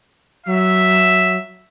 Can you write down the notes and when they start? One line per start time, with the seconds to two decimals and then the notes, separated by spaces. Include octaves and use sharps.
0.46 F#3 E5